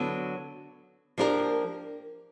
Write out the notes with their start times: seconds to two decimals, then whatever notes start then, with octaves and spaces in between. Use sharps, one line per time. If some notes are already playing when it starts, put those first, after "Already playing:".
Already playing: D3 F#3 B3
1.18 F3 A#3 D4 G4 A#4